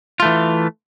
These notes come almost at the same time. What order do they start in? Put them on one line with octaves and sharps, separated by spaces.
F4 A3 E3